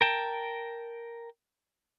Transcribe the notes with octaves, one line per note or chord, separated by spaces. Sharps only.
A#4 G5 A5